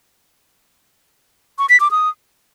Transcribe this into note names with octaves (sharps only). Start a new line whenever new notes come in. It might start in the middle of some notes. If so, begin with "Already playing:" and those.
C#6
B6
D6
D#6